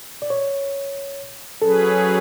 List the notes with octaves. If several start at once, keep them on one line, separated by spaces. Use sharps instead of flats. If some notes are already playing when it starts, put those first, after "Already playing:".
D5
C#5
F#3 C#4 G#4 A4 B4